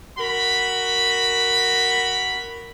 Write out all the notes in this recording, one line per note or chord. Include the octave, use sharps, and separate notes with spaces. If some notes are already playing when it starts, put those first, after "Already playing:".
F#4 A#4 B5